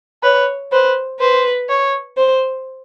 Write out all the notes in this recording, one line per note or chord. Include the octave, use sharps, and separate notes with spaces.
B4 C#5
B4 C5
B4 C5
C#5
C5